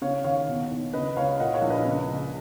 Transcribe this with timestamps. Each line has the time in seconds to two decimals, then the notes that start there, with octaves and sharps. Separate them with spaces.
0.02 C#3 C#5 F5
0.24 D#2 C#5 F5
0.48 B2
0.71 B1
0.93 C#3 B4 D#5
1.17 C#2 C#5 F5
1.39 A#2 D#5 F#5
1.54 C#5 F5
1.62 A#1
1.70 B4 D#5
1.85 C#3
2.08 C#2